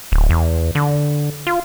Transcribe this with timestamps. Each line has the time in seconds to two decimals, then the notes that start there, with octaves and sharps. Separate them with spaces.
0.12 D1
0.30 E2
0.75 D3
1.47 F4